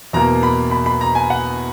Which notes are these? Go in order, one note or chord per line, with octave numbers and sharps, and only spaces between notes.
E2 B2 A#3 A#5
B5
B5
B5
A#5
G#5
F#5